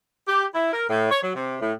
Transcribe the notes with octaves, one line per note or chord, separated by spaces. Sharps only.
G4
E4
A#4
A2
C#5
F#3
C3
A2